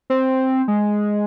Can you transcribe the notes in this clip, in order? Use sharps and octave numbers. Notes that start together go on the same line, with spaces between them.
C4
G#3